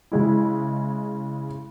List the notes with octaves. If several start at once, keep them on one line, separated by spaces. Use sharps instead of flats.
C#3 G#3 E4